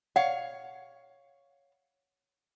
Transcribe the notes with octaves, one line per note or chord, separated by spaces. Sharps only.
C#5 F5 F#5